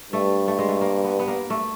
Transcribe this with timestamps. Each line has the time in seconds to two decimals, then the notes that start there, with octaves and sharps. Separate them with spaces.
0.13 G2 A3
0.48 A3
0.59 G#3
0.69 A3
0.81 A#3
1.04 B3
1.19 B3
1.28 A#3
1.50 A3